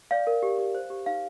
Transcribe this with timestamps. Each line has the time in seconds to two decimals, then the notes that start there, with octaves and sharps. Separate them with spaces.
0.11 D5 F5
0.27 A#4
0.43 G4
0.59 G4
0.75 C5
0.90 G4
1.06 D#4 F5